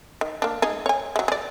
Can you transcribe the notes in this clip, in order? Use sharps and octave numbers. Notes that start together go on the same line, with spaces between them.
D#3
A#3 D4
G#3 D#4 G#4
C#5 G#5
F#3 G#3
G#4 D5